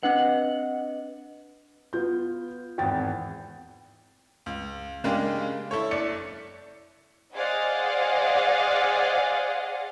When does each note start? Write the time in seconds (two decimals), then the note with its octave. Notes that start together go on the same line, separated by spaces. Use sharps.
0.03 C4 D4 B4 D#5 F#5
1.93 B3 F4 G6
2.78 G#1 E2 G5 A6
4.46 C#2
5.04 C#3 G#3 A#3 D4 G4
5.71 E4 A4 C#5
5.91 F#1 D5 C#7
7.35 G#4 C5 D5 D#5 F5 F#5